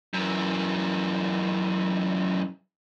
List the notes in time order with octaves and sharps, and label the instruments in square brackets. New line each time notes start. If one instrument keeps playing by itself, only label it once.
[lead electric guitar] F#2 E3